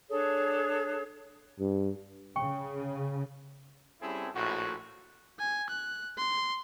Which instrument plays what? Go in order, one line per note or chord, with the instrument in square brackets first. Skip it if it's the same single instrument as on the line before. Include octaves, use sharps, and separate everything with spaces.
[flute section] D4 G#4 A4 C#5
[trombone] G2
[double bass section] C#3 [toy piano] G5 C#6
[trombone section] G3 C4 C#4 E4 G#4 A4
A#1 A2 F#4
[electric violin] G#5
F#6
C6